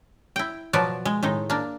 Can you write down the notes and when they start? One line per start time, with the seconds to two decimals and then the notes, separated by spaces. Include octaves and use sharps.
0.36 E4 G5
0.73 B2 F3 F#3 B3 D5
1.05 G#3
1.23 A2 D#3 G#3 D#4
1.50 A#3 D4